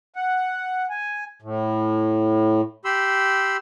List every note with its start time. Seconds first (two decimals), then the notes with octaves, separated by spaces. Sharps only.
0.16 F#5
0.90 G#5
1.42 A2
2.85 G4 B5 C6 E6